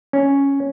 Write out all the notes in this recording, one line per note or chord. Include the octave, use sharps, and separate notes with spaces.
C#4